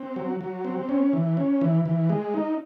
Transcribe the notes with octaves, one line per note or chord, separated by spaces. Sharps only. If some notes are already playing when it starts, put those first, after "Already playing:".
Already playing: C4
F#3
F#3
C4
C#4
E3
C#4
E3
E3
G#3
D#4